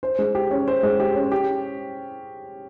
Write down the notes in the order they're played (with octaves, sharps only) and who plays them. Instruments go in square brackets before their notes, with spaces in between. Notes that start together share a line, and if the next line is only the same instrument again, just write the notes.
[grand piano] C5
G#3
G4
C#4
C5
G#3
G4
C#4
G4